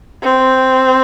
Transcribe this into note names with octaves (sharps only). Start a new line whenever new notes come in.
C4